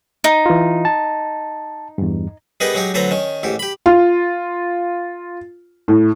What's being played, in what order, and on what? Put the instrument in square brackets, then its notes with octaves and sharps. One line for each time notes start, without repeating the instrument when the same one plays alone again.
[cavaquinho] D#4
[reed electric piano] E3 F4
A5
E2 G2
[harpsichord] G3 B3 D#4 G#4 A#4 B4
F#3 G#3 D#4 G4 C#5
D2 F#3 A4 B4 C5 A#5
D#3 C#4
A1 G#2 G4
G4 B5
[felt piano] F4
A2